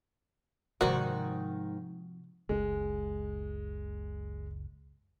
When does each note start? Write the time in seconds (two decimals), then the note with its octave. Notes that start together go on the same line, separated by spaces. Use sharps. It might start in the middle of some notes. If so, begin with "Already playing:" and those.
0.81 G#2 C3 D#3 F3 F#4 A#4 C5 D5
2.49 F#1 C#2 G#3